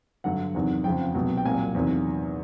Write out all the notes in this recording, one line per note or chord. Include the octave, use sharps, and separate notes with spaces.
G2 D3 F#3 F#5
E2 C3 D#3 F#3
F2 C#3 F3 G5
C2 B2 F#3
G5
C2 A#2 F#3 G#5
E2 C3 D#3 F#3